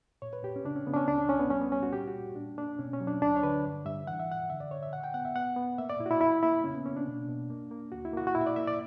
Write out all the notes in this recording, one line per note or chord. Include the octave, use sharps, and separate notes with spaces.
A#2 C#5
B4
A#2 G4
C#4
C#3 D4
C#4
C#3 B3
D4
C#4
C#2 D4
C#4
C#2 C#4
B3
G3 C#4
B3
G3 C#4
F#4
A#2 G4
F#4
A#2
A#2 D4
A#3 D4
B2 C#4
C#4
F#3
D4
D2 D4
C#5
D3 B4
G2
G2 E5
E3 F#5
E5
G2 F#5
D3 E5
D5
D3 C#5
E5
A#2 F#5
G5
B3 F#5
E5
B3 F#5
B3
A#3 E5
D5
A#2 E4
F#4
E4
E2 E4
A#3 E4
C#3 C#4
B3
A#3 C#4
D4
B2
B2
A#3
A#3
D2 F#4
E4
A#3 F#4
F#4
A#2 E4
E5
D5
A#3 E5
D5